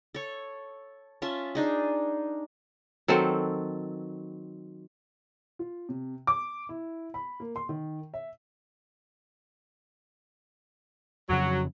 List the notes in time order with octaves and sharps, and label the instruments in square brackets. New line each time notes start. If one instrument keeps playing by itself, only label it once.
[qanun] A4 C#5
C#4 F4 E5 A5
D4 D#4 G#4
[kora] D#3 F#3 C4 A4
[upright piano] F4
C3
D6
E4
B5
A#3
C6
D#3
E5
[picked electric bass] F2 C#3 [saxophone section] F#3